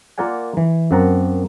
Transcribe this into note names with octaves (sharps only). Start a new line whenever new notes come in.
A#3 F4 A#4 D5 F#5 G#5
E3
F#2 A#3 C4 F#5 A5 A#5